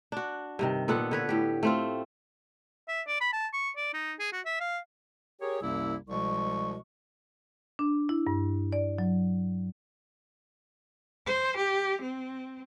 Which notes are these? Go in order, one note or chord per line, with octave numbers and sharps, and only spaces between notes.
D4 F#4
G2 C3 D#3
A#2 B3 A4 F#5
D3 B4 C#5
A2 G4
A3 C4 F4
E5
D5
B5
A5
C#6
D5
D#4
G#4
F#4
E5
F5
G4 G#4 A#4 C#5
C2 F#2 C3 A#3 E4 E6
C2 B2 F3 G#3 C#6
D4
E4
G2
D5
F#3
C5
G4
C4